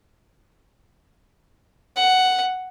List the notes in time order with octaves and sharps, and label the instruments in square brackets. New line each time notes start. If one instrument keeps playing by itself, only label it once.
[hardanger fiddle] F#5